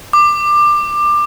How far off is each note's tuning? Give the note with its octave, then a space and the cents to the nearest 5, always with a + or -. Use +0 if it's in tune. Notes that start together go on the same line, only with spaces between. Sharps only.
D6 +20